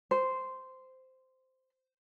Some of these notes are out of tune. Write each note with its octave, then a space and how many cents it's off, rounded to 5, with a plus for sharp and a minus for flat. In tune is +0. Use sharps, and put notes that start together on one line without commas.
C5 -10